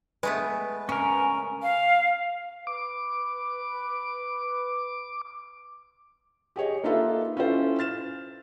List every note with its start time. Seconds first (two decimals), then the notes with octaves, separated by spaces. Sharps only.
0.23 G#3 A3 B3 B4
0.89 C#3 C#4 A#4 G#5
1.63 F5
2.67 B4 D6
6.56 G4 G#4 C#5 D#5
6.83 A#3 D#4 F4 A4 B4 E5
7.37 C#4 E4 F4 A4 C5
7.79 F6 A6 E7